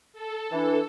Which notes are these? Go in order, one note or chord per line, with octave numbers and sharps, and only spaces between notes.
A4
E3 D4